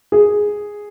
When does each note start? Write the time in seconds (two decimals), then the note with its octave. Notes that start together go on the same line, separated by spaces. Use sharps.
0.12 G#4